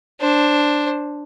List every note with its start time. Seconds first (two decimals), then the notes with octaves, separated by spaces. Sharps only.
0.20 D4 C5